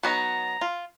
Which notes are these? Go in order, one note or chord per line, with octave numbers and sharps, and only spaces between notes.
F#3 B3 D#4 A#5
F4